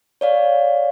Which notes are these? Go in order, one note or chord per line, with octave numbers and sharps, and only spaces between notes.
C#5 D5 F5